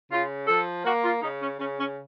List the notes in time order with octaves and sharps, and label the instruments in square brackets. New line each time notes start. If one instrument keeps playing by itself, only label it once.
[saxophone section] C#3 F4
F3 A4
A#3 F#4
F4
C#3 D#4
C#4
C#3 C#4
C#4